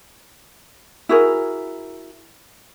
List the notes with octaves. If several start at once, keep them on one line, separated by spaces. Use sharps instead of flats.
E4 F#4 G#4 A#4